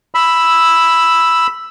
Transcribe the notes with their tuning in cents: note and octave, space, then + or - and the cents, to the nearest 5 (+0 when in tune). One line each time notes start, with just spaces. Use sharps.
B5 +0 E6 +0